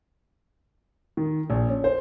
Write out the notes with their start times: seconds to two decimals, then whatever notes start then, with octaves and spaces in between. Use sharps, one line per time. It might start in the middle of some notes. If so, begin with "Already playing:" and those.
1.17 D#3
1.50 A#1
1.69 C#4
1.84 C5